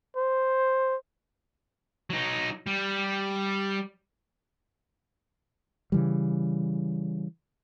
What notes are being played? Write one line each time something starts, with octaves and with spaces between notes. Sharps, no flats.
C5
F#3 D#4
G3
C#3 E3 G3